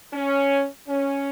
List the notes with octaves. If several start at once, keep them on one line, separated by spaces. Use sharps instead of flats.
C#4
C#4